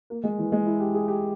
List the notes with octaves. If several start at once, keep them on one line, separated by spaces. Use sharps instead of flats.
A#3
G#3
E3
G#3
E4
G4
G#4
G4